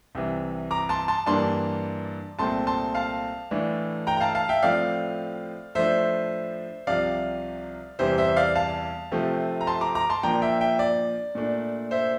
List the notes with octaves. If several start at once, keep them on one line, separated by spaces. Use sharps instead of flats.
C2 C3 E3
A#5 D6
A5 C6
A5 C6
G2 E3 A#3 D4 A5 C6
C2 A#2 A3 C4 A5 C6
A5 C6
F5 A5
A2 E3 A3 D4
G5 A#5
A#5
F5 A5
F5 A5
E5 G5
A2 F3 A3 C4 D5 F5
A2 F3 A3 D4 C5 E5
C2 C3 F3 D5 F5
E2 C3 E3 G3 C5 E5
C5 E5
D5 F5
F5 A5
C3 F3 A3 C4
A#5
A5 C6
A#5 D6
A#5 D6
A5 C6
A#2 F3 A#3 D4 G5 A#5
E5 G5
E5 G5
D5
A#2 A3 D4
C5 E5